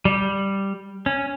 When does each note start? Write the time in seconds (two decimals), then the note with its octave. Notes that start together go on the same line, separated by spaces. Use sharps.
0.05 G3
1.06 C#4